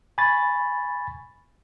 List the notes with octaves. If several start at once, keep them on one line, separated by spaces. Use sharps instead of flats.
G#5 B5 C#6 A6